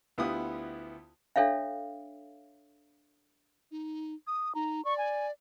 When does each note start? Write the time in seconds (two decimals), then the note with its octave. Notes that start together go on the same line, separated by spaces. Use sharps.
0.18 D2 B3 E4 F4 G4 D#6
1.36 D4 A4 C#5 E5 F5
3.71 D#4
4.27 D#6
4.55 D#4 A#5
4.85 D5 C#6
4.98 G#5